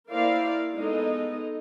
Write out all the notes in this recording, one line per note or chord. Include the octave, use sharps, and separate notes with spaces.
A#3 E4 A#4 C5 D5 F5
G#3 B3 D#4 A4 D#5